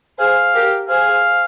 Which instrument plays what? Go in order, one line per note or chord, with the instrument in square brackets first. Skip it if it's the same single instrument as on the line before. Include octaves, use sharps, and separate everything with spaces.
[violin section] G#4 C5 [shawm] F5
[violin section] G4 A#4
[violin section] G#4 C5 [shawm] F5